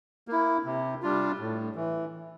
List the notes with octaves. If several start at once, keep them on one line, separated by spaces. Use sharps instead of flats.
A#3 E4
C3
G3 D4 F4
A2
E3